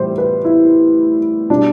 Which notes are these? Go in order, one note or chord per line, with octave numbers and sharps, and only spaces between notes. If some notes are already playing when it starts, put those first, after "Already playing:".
Already playing: A2 E3 G3 C5
B4
E4
B2 G3 D4